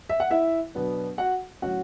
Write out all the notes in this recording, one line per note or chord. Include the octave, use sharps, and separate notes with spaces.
E5
F#5
E4 E5
B2 F#3 B3 D4
F#4 F#5
A2 F#3 C#4 F#4 F#5